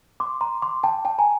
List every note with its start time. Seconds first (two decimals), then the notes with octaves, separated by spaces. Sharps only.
0.20 C6 D6
0.41 A#5 C6
0.62 C6 D6
0.84 G5 A5
1.05 G5 A5
1.19 G#5 A#5